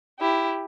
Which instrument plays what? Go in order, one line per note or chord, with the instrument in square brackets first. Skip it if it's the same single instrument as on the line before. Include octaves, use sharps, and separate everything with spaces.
[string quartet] E4 G4